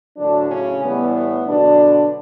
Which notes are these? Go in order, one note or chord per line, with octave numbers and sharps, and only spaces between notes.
A2 D3 F#3 D4
C#3 C#4
A2 E3 G3 B3
B3
B2 D3 F#3 D4